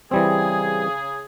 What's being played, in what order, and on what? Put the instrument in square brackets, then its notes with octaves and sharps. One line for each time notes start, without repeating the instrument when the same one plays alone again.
[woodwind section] C#3 G#4 [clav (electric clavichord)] E3 G3 C4